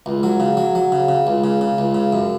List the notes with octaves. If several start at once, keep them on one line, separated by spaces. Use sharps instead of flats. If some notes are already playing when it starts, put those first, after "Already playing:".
C#2
F#3
C#3
F#3
F#3
C#3
C#3
C#2
C#3
C#3
C#2
C#3
F#2